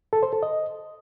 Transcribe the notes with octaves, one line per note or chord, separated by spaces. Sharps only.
A4
C5
A4
D#5